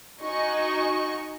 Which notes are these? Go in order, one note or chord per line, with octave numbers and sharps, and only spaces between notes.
D#4 F#4 D#5 G#5 C#6